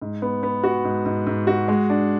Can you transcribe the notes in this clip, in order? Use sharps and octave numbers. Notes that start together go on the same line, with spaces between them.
G#2
B3
B3
F#4
G#2
G#2
G#2
F#4
G#3
D4